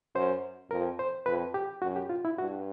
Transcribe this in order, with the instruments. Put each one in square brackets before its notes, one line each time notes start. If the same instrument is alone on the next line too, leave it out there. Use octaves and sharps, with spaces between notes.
[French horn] F#2 [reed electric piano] C5
[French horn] F2 [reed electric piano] A#4
[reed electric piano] C5
[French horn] F2 [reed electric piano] B4
[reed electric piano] G4
[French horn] F#2 [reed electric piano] F#4
[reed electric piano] G4
F4
E4
[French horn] G2 [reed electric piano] F#4